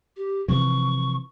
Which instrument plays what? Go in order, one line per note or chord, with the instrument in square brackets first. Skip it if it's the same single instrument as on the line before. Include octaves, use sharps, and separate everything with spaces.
[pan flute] G4
[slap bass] C3 E3 F3 [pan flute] C#6